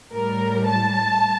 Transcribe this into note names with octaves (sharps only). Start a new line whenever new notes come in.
A2 G3 A#4
A5